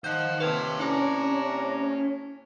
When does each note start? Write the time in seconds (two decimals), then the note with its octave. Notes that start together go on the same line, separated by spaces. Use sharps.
0.04 D#3 C5 D#5 F5 F#5 A5 G6
0.40 F2 C3 B4 C#5 F5 A5
0.80 C3 C#4 D4 E4 G#5 A#5